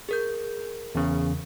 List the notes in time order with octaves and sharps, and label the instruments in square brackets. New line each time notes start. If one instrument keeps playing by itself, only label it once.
[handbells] G#4 A#4 G6
[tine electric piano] E2 C#3